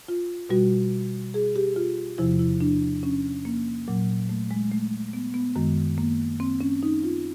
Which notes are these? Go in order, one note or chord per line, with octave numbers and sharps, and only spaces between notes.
F4
B2 G3 F#4
G#4
G4
F4
E2 C3 F3 E4
E4
D4
C#4
A#3
A#2 F#3
A3
G#3
A3
B3
B3
F#2 D#3 G#3
A#3
C4
C#4
D#4
F4